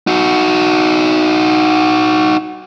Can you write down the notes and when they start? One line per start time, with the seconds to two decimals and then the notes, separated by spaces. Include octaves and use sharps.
0.07 D#4 F#4